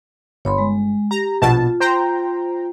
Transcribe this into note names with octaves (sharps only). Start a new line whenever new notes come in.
G1 C#5 B5 C6
G#3
G4 A#5
A#1 B2 F4 A5
C5 G5 A#5